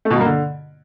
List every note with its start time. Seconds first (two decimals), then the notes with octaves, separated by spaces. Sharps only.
0.05 A3
0.10 B2
0.15 G2
0.21 A#3
0.26 D3